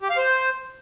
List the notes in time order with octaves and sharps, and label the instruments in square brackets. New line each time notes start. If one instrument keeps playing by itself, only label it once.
[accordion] G4
F5
C5